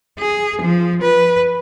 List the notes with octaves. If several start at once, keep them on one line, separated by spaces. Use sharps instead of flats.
G#4
F3
B4